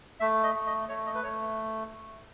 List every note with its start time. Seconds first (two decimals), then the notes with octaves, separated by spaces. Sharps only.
0.20 A3 E5
0.43 D#5
0.55 A3
0.67 D#5
0.89 A3 C#5
1.06 D#5
1.15 B4
1.23 A3 C#5